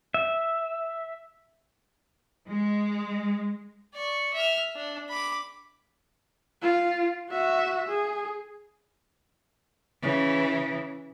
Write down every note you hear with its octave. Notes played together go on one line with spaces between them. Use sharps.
E5
G#3
D5 C#6
E5 F6
D4
B5 D6
F4
F#4 E5
G#4
C#3 E3